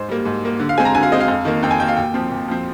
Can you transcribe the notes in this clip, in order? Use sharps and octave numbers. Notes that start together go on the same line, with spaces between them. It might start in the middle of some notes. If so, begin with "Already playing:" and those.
Already playing: G#2 C5
G3 A#3
G#2
G3 A#3
D3
F5
G#3 C4 G#5
A#5
D3 G#5
F5
G#3 C4 D#5
F5
F2
D#3 A#3
F2 G5
G#5
D#3 A#3 G5
F5
A#2 G5
F3 C4
A#2
F3 C4